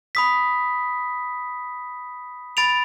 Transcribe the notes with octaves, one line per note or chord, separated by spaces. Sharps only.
B5 D#6 B6
B5 A6 D7 F7